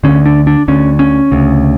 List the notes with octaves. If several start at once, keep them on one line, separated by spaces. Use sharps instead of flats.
D2 D3 C#4
D4
D4
D2 D3 C#4
C#4
D2 C#3